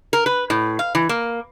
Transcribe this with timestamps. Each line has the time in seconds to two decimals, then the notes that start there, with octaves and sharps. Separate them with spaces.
0.13 A#4
0.26 B4
0.50 A2
0.79 F5
0.95 E3
1.09 A#3